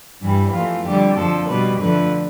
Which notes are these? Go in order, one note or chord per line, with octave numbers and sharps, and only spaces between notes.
G2 E3 G3
F2 E3 A3 F4
F2 D3 G3 G4
F2 D3 F3 A4
B2 G3 B4
F2 D3 F3 A3 B4